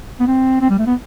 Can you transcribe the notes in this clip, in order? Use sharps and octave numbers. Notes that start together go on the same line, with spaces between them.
B3
C4
C4
G3
A3
B3